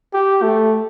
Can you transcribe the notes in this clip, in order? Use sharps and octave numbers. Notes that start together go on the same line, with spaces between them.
G4
A3